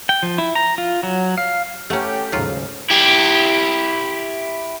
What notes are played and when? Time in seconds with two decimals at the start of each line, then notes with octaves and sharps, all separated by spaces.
0.09 G5
0.23 F3
0.38 E4
0.55 A#5
0.78 F4
1.03 F#3
1.38 F5
1.90 A3 C#4 G4 A4 F#5 A#5
2.32 D#2 G#2 C#3 F#3 F4
2.90 E4 G4